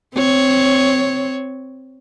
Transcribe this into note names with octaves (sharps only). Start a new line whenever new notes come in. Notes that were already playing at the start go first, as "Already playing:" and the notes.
C4 C#5